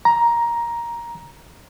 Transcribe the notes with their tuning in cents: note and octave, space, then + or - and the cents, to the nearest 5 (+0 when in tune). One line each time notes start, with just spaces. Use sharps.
A#5 +10